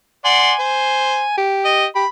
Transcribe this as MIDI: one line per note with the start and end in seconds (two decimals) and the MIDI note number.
0.25 0.53 74
0.25 0.53 78
0.25 1.35 80
0.25 0.53 84
0.59 1.23 72
1.37 1.87 67
1.65 1.85 75
1.95 2.05 67
1.95 2.08 83